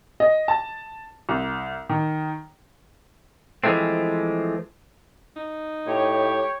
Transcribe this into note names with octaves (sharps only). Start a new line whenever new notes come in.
D#5
A5
C2
D#3
E3 F3 G#3 A3 C4
D#4
A2 G4 C#5